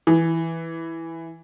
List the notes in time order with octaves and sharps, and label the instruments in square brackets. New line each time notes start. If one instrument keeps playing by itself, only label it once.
[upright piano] E3